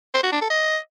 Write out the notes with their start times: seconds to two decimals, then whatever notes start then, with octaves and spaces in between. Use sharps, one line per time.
0.14 C5
0.23 F#4
0.32 D4
0.41 A4
0.50 D#5